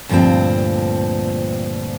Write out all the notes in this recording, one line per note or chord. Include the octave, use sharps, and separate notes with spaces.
D2 G2 A#2 F3 C4